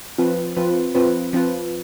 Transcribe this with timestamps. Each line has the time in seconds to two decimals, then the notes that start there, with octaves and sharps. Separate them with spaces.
0.18 F3 C4 F4 B4
0.57 F3 C4 F4 B4
0.95 F3 C4 F4 B4
1.33 F3 C4 F4 B4